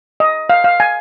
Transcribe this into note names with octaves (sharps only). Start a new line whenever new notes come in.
D#5
F5
F5
G#5